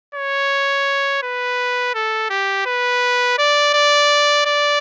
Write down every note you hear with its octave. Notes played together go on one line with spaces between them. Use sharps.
C#5
B4
A4
G4
B4
D5
D5
D5